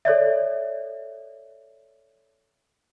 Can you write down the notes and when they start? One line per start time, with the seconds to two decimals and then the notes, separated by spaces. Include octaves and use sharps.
0.05 A4 C#5 D5 E5